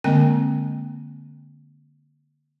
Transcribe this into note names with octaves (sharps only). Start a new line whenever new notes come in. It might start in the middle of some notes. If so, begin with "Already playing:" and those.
D3 G#3 A#3 C4 D#5 G5